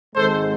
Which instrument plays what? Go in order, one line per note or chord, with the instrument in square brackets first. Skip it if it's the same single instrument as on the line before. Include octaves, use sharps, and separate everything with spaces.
[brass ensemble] G#1 G#2 G#3 A4 C5